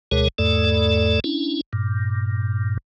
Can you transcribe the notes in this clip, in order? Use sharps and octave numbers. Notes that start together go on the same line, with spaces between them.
D2 B2 G#3 G#4 A#4 C#5
E2 G#2 A3 A4 D5
C#4 D4 E4
G2 A#2